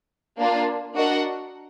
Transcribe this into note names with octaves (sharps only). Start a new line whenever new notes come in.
A#3 D4 F4
D4 F#4 A#4 D#5 F#5